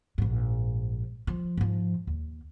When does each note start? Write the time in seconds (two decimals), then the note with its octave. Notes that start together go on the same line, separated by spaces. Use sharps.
0.18 A#1 G#2
1.27 F3
1.57 G#2 F3
2.07 D#2